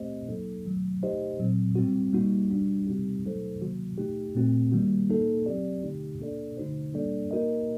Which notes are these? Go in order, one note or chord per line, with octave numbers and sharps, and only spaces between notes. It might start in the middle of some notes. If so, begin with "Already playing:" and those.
Already playing: A3 C4 G4 C5 D#5
A2 F#3 A#3 D#4 A4
D#3 F#3 A3
A3 D#4 G4 C5 D#5
A#2 F#3 C4
A2 G3 C4 F#4
G3 A#3 D#4 F#4
G3 D4 F#4
C3 G3 C4 D#4 G4
F#3 A3 D#4 A4 C5
C3 D#3 F#3 A#3 F#4
A3 D#4 G4
A#2 A3 C4 F#4
D#3 G3 A#3 F#4
A#3 D#4 A4
F#3 C4 G4 D5
D3 A3 D#4 G4
A#3 D4 A4 D5
D3 A3 D#4 F#4 C5
G3 A#3 D4 A4 D5
A#3 D#4 F#4 A#4 D#5